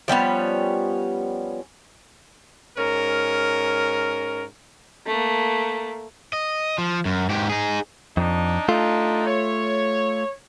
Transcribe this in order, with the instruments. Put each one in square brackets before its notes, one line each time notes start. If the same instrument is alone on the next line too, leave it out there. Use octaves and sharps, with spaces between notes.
[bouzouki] F3 G3 B3 C#4
[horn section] G#2 C#4 A#4
[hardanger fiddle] A3 A#3
[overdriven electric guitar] D#5
F3
F#2
G#2 G4
D#4 G#4
[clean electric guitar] F2 [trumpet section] D4 D#4
[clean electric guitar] A3 F4 [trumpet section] D4 D#4
[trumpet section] C#5